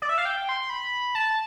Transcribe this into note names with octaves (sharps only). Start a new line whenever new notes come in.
D5
E5
F5
G5
C6
B5
A5